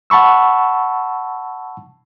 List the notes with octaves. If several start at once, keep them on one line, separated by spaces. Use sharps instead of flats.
F#5 A5 B5 C#6 E6